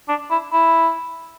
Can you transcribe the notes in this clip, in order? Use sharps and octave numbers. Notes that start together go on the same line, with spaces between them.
D4
E4
E4